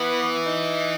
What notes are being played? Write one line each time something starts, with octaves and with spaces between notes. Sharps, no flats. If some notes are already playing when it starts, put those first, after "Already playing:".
Already playing: E3 B3
D#4